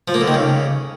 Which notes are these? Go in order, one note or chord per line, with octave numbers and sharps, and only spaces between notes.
F3
A#3
D3
D#3
C#3